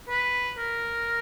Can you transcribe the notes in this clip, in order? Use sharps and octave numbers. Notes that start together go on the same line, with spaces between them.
B4
A#4